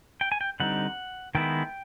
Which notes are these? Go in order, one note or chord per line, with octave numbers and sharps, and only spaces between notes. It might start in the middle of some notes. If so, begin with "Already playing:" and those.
G5
G#5
G5
D3 G3 C4 D#4 F#5
D#3 G#3 B3 E4 G5